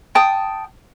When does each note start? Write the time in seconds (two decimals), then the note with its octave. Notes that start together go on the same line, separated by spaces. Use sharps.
0.15 G5 A5 D#6